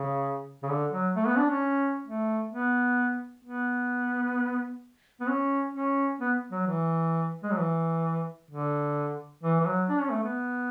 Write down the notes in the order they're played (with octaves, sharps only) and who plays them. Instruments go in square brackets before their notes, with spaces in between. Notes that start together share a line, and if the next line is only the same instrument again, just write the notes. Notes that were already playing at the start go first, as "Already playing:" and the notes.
Already playing: [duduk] C#3
C#3
D3
F#3
A3
B3
D4
C#4
A3
B3
B3
B3
C#4
C#4
B3
F#3
E3
G#3
F#3
E3
D3
E3
E3
F#3
D4
C#4
A3
B3